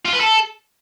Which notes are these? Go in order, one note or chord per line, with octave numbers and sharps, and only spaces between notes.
F4
B4
A4